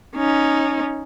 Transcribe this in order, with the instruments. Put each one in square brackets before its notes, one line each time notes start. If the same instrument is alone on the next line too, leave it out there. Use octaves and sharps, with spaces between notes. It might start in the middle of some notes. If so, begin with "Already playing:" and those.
[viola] C#4 D#4